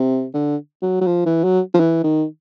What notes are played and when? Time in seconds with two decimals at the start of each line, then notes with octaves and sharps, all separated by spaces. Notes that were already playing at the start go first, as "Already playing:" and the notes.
Already playing: C3
0.34 D3
0.82 F#3
1.01 F#3
1.07 F3
1.26 E3
1.44 F#3
1.74 F3
1.80 E3
2.04 D#3